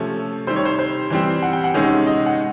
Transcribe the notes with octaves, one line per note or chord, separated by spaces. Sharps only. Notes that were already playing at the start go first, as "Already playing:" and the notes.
Already playing: C3 F3 A3 C#4 C#5
C3 D#3 G3 C5
C#5
C5
C5
E3 G3 C4
F#5
G5
F#5
C3 D#3 G#3 C#4
D#5
F#5